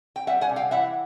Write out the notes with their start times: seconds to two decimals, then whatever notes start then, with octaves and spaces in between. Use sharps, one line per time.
0.16 G5
0.27 G3 E5 F#5
0.41 F#5 G#5
0.49 C3
0.56 F5 G5
0.71 E3 E5 F#5